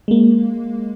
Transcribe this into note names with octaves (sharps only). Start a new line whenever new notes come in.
G#3 A#3